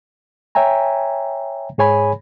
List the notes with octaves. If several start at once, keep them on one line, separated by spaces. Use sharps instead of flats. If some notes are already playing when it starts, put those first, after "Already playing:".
C#5 E5 G5 G#5 A#5
G#2 G#4 C#5 G#5 B5